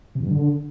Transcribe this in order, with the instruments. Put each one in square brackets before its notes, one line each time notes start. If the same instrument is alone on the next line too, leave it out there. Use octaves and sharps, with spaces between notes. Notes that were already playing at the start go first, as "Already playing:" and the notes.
[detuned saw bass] C3
E2
G2
D3